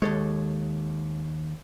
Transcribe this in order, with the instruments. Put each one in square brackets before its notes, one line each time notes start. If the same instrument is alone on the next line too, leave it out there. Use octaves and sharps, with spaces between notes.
[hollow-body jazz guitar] D#2 A4 C#5 [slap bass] G#3